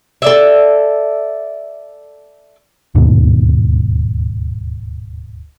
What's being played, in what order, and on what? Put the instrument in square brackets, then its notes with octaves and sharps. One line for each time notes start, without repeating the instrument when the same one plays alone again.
[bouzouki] A4 D5 E5
[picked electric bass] D1 D#2 G#2 B2